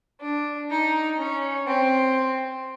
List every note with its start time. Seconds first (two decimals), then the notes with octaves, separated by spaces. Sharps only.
0.22 D4
0.72 D#4
1.20 C#4
1.69 C4